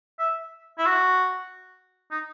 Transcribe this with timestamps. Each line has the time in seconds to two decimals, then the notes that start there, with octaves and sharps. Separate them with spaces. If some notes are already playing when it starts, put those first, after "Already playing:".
0.19 E5
0.79 E4
0.86 F#4
2.11 D#4